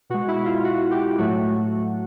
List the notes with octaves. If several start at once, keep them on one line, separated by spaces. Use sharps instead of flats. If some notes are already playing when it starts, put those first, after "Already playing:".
B2 G#3 F#4
E4
F4
F#4
G4
A2 F#3 A3 F#4